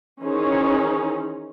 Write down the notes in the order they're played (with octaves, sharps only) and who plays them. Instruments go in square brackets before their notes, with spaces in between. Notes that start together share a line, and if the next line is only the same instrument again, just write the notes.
[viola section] D#3 E3 C#4 D#4 G#4 C5